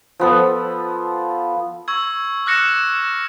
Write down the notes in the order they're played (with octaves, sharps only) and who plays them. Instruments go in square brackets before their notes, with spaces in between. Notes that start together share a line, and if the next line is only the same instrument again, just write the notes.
[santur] F3 B3 A4
[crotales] C#6 E6 G#6
D6 F6 F#6 A#6 C#7 E7